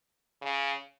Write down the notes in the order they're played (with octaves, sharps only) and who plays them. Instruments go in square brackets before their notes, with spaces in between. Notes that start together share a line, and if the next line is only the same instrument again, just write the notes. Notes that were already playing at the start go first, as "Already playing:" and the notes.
[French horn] C#3